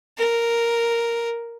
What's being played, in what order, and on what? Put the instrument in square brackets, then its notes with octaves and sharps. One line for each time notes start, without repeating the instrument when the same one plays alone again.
[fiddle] A#4